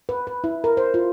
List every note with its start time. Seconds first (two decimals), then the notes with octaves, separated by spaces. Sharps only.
0.09 B4
0.27 B4
0.44 E4
0.64 A#4
0.77 C5
0.94 F4